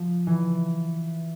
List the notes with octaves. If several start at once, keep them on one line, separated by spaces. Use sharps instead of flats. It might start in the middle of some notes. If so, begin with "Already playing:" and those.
Already playing: F3
E3